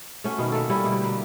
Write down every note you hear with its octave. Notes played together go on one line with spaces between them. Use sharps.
A3 C#4 F#4
B2 D#3 A#3
A3 A#3 A4
G3 C#4 E4 C#5
B2 D3
A#3 G4